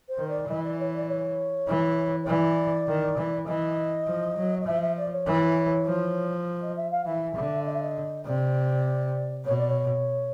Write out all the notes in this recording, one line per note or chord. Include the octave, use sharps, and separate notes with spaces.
C5
D#3
D5
E3 D#5
D5
C#5
D5
C#5
E3
C#5
E3 D5
D#3
E3
E3 D#5
F3
F#3
D#5
F3 E5
E5
D5
C#5
E3
F3
D#5
E5
F5
E3 E5
D3
D#5
E5
D#5
C3 D5
B2 C#5
D5
C#5